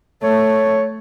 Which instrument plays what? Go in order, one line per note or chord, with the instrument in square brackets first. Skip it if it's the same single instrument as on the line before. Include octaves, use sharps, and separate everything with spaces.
[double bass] A3 [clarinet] C#5